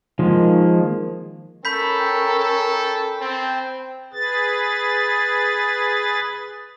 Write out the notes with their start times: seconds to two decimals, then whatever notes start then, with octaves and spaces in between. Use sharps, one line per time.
0.19 D#3 F3 G#3 A#3
1.65 C#4 A4 A#4 B5 G6 B6
2.00 G5
2.39 A4
3.20 C4 G5 A5
4.13 G#4 B4 A6